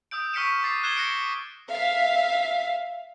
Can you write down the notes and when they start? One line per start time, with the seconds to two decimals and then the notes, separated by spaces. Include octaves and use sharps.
0.11 D#6 E6 G6 D7
0.33 C#6 F6 B6 C#7 D7 E7
0.63 D6 A6 C7
0.83 F#6 G#6 C7 E7 G7
0.95 A#6 C#7 D7 G7
1.71 E5 F5 B6